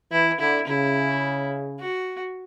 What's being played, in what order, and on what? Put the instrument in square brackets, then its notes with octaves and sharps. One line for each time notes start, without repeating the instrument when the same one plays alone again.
[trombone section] E3 [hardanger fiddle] E4
[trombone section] D3 [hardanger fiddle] E4
[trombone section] C#3 [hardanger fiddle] E4
[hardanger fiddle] F#4